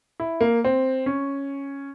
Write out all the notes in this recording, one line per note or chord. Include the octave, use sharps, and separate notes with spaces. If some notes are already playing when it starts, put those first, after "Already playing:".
E4
A#3
C4
C#4